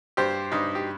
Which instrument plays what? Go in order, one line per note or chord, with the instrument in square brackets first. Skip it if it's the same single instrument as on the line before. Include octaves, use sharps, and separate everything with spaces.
[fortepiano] G2 G4 C5
G2 D#4
G4